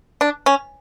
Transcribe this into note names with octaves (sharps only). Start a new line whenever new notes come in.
D4
C#4